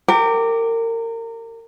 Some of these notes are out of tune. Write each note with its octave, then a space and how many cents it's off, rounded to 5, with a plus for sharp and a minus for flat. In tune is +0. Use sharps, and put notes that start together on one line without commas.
G4 +0 A#4 -30